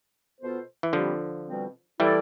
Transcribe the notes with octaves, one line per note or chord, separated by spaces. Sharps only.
B2 B3 F4 A4 C5
E3
A2 D3 F3 G3 C4 G4
B2 G3 C4
E3 G3 A3 E4 A4 D5